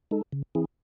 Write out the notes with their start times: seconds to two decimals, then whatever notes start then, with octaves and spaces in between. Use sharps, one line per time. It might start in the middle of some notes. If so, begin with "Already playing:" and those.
0.11 G#3 D#4 A4
0.33 C#3
0.55 E3 C4 E4 G#4